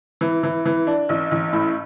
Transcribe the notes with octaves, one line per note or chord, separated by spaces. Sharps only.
E3
E3
E3
D4
A1
A1
A2